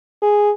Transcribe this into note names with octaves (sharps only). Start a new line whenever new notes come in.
G#4